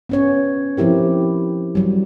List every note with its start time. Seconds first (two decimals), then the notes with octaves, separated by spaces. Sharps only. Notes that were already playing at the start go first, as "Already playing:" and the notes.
0.09 B3 C#4 C#5
0.77 F3 C4 E4 G4 A#4
1.75 F#3 G3